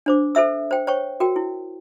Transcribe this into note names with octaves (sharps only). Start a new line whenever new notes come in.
D4 C5 D6
A4 C5 E5 E6
C5 G5
C5 C#5 G5 C#6
F#4 A#4 G5
E4